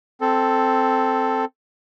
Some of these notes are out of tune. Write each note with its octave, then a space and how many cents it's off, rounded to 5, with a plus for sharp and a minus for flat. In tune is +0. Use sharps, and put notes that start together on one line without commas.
C4 +0 A4 +0